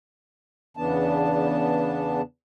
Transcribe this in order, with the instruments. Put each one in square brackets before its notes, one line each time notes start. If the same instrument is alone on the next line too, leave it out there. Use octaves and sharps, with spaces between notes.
[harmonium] E2 C#3 E3 B3 D4 A5